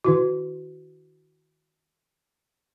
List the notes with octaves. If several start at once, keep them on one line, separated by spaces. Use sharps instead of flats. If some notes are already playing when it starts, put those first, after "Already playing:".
D#3 E4 F#4